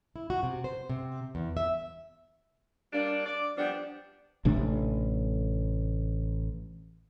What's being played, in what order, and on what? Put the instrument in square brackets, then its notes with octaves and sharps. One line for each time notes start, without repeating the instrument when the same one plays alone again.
[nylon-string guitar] E4
F#4
C3
C5
C3
E2
E5
[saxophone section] G3 A#3 D4
D5
F3 G3 B3 D4
[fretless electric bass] A1 C3 A3 D4